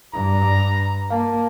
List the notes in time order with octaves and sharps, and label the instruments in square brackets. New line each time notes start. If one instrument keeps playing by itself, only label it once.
[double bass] G2 [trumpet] A#5
[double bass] A#3 [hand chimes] F5 A5